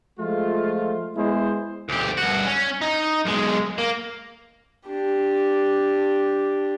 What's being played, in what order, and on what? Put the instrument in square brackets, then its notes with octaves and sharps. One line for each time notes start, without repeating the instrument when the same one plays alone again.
[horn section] F3 G#3 A3 F4
G#3 B3 E4 G#4 C5
[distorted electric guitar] D2 G4
G2 F#4
C#4
D#4
B1 G#3
A#3
[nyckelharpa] D4 G4